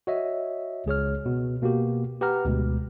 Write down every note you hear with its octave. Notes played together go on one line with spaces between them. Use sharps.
F#4 C#5 D#5 E5
C#2 G#4 C#5 F6
B2
B2 A#3 F#4 G4
G4 B4 F#5 A#5 F6
D2 B2 G#3